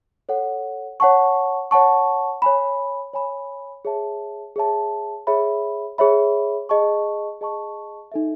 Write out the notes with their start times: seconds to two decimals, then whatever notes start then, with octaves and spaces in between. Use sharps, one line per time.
0.29 A4 C#5 F#5
1.00 C#5 F#5 A5 C#6
1.71 C#5 F#5 A5 C#6
2.42 C#5 G#5 B5
3.13 C#5 G#5 B5
3.85 G#4 C#5 E5 A5
4.56 G#4 C#5 E5 A5
5.27 G#4 C#5 E5 B5
5.98 G#4 C#5 E5 B5
6.69 G#4 D#5 A5 C#6
7.41 G#4 D#5 A5 C#6
8.12 D#4 A4 E5